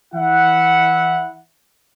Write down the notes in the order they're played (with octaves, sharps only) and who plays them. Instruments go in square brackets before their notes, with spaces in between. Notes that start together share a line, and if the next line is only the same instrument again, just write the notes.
[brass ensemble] E3 E4 E5 F#5